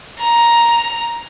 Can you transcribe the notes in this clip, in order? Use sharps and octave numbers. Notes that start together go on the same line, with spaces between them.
A#5